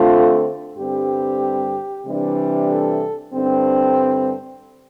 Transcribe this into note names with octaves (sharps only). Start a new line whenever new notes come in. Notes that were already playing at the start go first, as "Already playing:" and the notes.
Already playing: D3 A3 C4 F4
G2 D3 G3 C4 G4
C3 E3 G3 D4
A4
G2 D3 G3 C4